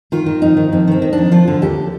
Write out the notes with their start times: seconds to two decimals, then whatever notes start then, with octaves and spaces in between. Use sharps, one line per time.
0.12 D#3 F4
0.26 D#3
0.42 F2 D#4
0.57 D#3
0.72 F2 C4
0.88 D#3 C4
1.02 D#3
1.13 D4
1.18 F2
1.31 F3 F4
1.48 D3
1.62 D#2 G4